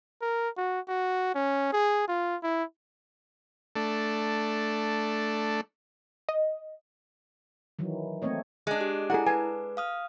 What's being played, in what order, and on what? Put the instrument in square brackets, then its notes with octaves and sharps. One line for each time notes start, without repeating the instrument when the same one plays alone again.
[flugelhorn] A#4
F#4
F#4
C#4
G#4
F4
E4
[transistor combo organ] A3 D4
[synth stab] D#5
[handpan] D#3 E3 F#3
A3 A#3 C4 C#5 D#5
[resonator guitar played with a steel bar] G#3 D4 [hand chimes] D#5
[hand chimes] G4 G#4
[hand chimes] E4 A#5 [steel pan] G#4 A4 F#5
[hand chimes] B4 [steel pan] G#5
[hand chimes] F5 D#6 F6